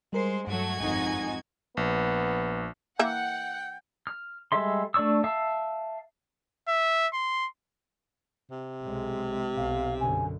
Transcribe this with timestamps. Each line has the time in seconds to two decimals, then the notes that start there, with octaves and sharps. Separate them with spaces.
0.13 G3 G#3 A#4 C5 C7
0.47 G2 F#3 A3 F#4 G#6
0.78 G#1 F2 D#4 G#5
1.77 A#1 B3
2.99 E3 A#3 E5 F#5 G5
4.07 F6
4.52 G3 G#3 A4 E5 C6
4.94 A3 D4 D5 C#6 E6
5.24 E5 F5 A5 E6
6.68 E5
7.14 C6
8.51 C3
8.83 B1 G#3
9.57 B1 F5
10.00 F#2 B2 D3 G#5